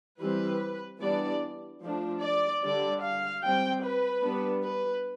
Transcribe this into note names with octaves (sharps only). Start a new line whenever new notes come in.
E3 G3 C4 B4
E3 G3 B3 D4 D5
F3 A3 D4
D5
D3 G3 D4 D5
F5
G3 C4 G5
B4
G3 B3 D4
B4